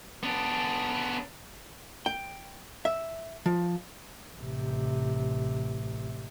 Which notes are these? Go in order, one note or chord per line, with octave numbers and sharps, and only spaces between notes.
B3 D4
G5
E5
F3
A1 C3